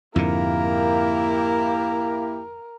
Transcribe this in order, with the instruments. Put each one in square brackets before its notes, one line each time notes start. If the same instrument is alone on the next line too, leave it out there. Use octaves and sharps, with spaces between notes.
[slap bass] F2 G#2 D3 [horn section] A#3 E4 G4 [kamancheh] A#4